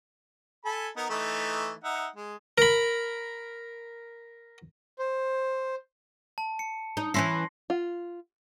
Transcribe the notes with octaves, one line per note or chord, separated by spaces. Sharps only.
A4 G#5 B5
B3 D#4 A#4
E3 A3 D#4
D#4 E5 F#5
G#3
A#4 B5
C5
A5
C#7
D#4
E3 C#4 E4 C6 A#6 C7
F4